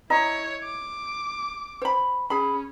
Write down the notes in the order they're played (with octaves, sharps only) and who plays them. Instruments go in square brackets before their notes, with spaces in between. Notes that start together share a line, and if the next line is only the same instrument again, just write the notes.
[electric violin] E4 C#5 [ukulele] D#5 A#5
[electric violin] D6
[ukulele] C5 B5
[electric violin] C#4 [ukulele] G#4 B5